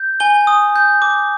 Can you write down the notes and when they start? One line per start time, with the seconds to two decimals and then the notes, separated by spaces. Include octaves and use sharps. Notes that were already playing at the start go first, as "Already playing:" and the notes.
Already playing: G6
0.20 G#5 G7
0.47 D#6
0.76 G6
1.02 D6